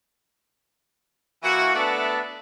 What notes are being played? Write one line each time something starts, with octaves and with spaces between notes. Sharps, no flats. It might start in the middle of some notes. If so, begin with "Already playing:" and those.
E3 A#3 E4 F#4
A3 B3 D4 D5 E5 A5